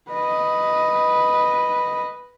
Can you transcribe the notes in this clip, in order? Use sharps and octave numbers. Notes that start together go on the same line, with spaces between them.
B4 D#5